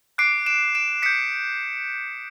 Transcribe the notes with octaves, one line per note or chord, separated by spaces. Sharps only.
D6 F#6 C7 D7
D7 E7
D7 E7
D#6 G6 B6 C#7